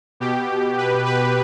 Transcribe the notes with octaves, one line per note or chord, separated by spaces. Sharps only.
B2 G4
B4
B4